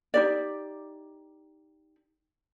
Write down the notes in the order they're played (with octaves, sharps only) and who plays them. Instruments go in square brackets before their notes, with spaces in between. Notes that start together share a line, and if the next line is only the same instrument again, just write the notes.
[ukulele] D#4 G4 D5